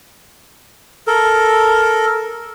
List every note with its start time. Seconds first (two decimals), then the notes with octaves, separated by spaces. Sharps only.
1.07 A4 A#4